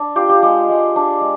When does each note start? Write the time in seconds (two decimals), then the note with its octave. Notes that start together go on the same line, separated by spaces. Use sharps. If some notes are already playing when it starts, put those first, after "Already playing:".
Already playing: D4
0.16 F4 G4
0.29 G4
0.43 G#3 G4
0.69 G#3
0.96 D4
1.21 G#3